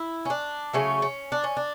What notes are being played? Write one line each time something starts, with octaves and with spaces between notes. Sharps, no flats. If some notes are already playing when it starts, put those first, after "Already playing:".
Already playing: E4
C#4
D4
C#3 F#3 A3 C#4
C#4
D4
C#4
D4